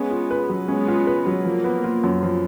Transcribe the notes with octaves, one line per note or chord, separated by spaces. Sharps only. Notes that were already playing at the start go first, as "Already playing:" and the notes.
Already playing: G#3 B3 C#4
F4
B4
F#3
G#3 B3 C#4
F4
B4
F#3
F3 A#3
B3
F4
F#2
F3